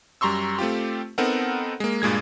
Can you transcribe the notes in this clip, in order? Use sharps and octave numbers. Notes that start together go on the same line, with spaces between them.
F#2 G3 A#5 C6 C#6 E6
A3 C4 F4 G4
B3 C4 D#4 A4 A#4 F#5
G#3 A#3
G2 A#2 G#3 G#6